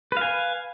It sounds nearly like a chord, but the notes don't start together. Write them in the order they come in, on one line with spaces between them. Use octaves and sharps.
B4 F5 G#5